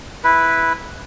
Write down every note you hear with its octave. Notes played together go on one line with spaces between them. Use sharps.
E4 B4